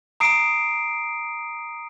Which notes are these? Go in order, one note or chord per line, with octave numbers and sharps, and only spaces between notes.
A#5 D#6 C7 D7